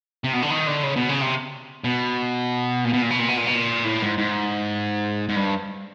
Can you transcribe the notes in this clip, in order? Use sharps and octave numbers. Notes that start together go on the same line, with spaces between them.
C3
B2
D3
D#3
D3
C#3
B2
C#3
C3
B2
A#2
B2
A#2
B2
A#2
B2
A#2
B2
A#2
A2
G#2
G#2
G#2
G2